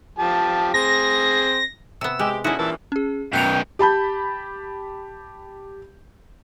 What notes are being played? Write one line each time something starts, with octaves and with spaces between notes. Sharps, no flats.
F3 G4 A5
C4 G#4 A#6
C3 B3 E6
G#3 G4
D3 C#4 D#4 E4 F#4
G2 A#2 E3 E4 A5
C#4 G#4
F#2 B2 G5 F#6 C#7 F7
G4 A5 B5 G6